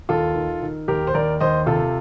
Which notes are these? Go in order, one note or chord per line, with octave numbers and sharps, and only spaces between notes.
D#2 F4 A4
D#3
D#3
D#2 G4 A#4
C5
D#2 A#4 D5
D#2 C5 D#5
C3 F4 A4